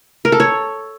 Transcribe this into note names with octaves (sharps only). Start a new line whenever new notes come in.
A#4
A4
C#5